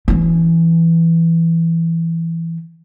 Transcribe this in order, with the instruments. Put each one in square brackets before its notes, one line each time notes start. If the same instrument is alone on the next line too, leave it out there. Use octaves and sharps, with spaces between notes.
[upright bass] E3 C#4